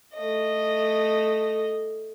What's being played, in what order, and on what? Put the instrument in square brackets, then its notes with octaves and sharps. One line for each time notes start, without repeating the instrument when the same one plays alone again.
[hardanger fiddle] A3 D#5